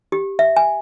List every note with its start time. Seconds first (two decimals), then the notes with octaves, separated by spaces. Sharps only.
0.12 G4
0.39 E5
0.56 G#5